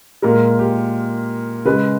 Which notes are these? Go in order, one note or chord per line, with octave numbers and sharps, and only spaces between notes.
A#2 G#3 A#4
G4
C#3 G#3 B4